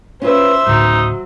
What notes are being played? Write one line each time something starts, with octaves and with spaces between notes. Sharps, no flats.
C#4 F4 B4 C5 E5
D1 A1 C#3 F#3 D#4